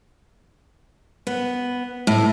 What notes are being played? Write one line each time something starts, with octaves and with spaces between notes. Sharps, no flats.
B3
A2